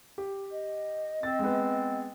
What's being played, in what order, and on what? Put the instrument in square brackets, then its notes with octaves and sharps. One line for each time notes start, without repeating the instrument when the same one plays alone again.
[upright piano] G4
[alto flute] D#5
[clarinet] C4 [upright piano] A6
[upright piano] G#3 B3